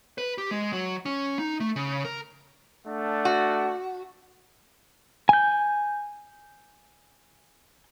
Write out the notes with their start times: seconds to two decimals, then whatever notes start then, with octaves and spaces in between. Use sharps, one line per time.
0.18 B4
0.38 G4
0.51 G#3
0.73 F#3
1.06 C#4
1.39 D#4
1.60 A3
1.76 C#3
2.05 A#4
2.87 A3 D4 F#5
3.25 F#4
5.29 G#5 G6